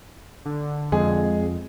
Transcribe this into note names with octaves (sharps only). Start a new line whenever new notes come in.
D3
F2 G#3 G#4